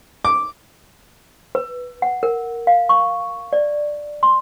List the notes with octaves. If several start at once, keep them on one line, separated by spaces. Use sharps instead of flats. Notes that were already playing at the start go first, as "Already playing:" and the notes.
D6
B4
F#5
A#4
F5
C#6
D5
C6